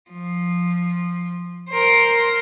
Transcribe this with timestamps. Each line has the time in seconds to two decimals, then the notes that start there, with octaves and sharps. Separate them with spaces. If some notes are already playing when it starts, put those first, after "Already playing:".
0.11 F3
1.70 A#4 C5